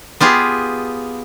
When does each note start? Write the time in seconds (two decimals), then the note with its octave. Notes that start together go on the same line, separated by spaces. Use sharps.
0.20 B3 F4 G4 G#4